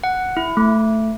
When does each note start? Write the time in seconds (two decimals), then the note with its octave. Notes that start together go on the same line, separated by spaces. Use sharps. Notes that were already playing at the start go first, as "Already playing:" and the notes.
0.04 F#5
0.37 E4
0.57 A3